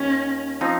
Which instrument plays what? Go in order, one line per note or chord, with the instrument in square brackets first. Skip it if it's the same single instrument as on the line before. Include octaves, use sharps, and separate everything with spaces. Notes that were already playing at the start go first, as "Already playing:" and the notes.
Already playing: [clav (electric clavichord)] D#2 [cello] C#4
[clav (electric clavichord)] F3 C4 D#4